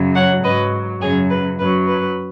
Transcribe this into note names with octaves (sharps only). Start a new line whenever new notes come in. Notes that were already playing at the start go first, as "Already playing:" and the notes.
Already playing: F#2 C#3 F#3
C#5 F#5
G#2 F#3 B4 D#5
F#2 C#3 F#3 G#4 C#5
B4
F#2 F#3 B4
B4